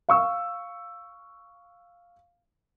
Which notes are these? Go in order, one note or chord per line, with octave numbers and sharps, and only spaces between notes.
F5 C#6 E6